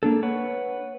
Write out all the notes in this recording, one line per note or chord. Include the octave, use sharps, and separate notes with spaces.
A#3 D4 A4
B4 C#5 F#5